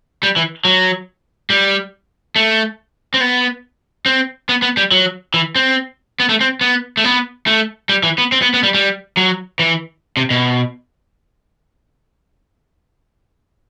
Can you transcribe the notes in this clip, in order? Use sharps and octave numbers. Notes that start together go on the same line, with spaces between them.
G3
E3
F#3
G3
A3
C4
B3
C4
B3
B3
G3
F#3
E3
C4
B3
A3
C4
B3
A3
B3
A3
G3
E3
B3
C4
B3
B3
G3
G3
F#3
E3
C3
B2